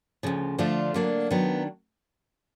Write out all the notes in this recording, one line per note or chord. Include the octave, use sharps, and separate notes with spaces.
D2 C#3 F3
D3 F3 A3 D4 F4
D3 F#3 A#3 D4
D#3 F#3 B3 D4